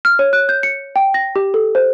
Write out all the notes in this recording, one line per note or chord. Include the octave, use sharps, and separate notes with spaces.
F6
C#5
F#6
G6
C#7
G5
A#6
G4
A4
C5